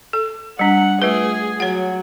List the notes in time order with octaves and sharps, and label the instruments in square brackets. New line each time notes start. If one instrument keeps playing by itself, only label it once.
[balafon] A4
[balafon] G3 D4 [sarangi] F#5
[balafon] A3 F4 B4 [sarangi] G#4
[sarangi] F#3 [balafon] C#5 F#5